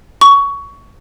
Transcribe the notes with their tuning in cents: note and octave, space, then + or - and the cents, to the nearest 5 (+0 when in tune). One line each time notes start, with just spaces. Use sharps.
C#6 +15